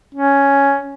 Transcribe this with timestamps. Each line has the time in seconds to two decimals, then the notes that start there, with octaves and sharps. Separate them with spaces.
0.15 C#4